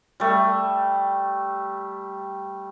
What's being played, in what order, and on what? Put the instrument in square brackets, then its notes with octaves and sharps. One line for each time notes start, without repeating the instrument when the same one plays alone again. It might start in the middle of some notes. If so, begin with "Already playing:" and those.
[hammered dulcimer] G3 A3